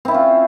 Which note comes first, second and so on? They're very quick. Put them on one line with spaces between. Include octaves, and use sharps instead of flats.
C4 E4 C#4 F4